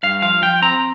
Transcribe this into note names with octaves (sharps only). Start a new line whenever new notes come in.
G2 F5
F3 F5
F3 G5
C4 A#5